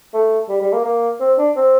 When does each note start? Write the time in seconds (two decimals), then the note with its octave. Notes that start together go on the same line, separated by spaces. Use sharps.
0.14 A3
0.49 G3
0.61 G3
0.73 A#3
0.85 A#3
1.20 C4
1.38 D4
1.56 C4